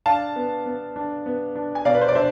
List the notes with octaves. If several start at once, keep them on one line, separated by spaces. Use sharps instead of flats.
D4 F5 A5
B3
B3
D4
B3
D4
G#5
B2 D5 F5
B4
C5
D5
D4 C5 E5